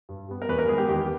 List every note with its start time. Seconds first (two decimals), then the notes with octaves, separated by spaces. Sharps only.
0.09 G2
0.29 G3 B3
0.42 A#4
0.49 E2 B4
0.59 A#4
0.68 D#3 G#3 B3 G#4
0.78 G4
0.89 E2 G4